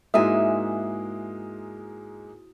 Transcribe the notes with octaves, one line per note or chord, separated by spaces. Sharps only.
G#2 G#3 A#3 E4 F#4 E5 G#5 D#6